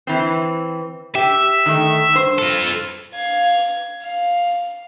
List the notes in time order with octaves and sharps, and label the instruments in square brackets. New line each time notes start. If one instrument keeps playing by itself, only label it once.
[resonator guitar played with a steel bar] E3 C4
[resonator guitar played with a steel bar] G4 [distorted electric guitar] E5
[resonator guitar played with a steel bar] D#3 A3
G2 C5
[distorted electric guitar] F4 A4
[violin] F5 G#6
F5